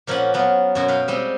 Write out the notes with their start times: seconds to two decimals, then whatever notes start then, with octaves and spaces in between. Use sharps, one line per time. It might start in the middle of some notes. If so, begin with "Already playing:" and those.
0.07 A#2 F3 A#3 C#4 B4 F#5
0.34 F#3 B3 F4
0.75 F#2 B2 F#4
0.88 B4 F5 G5
1.08 G3 G#3 C4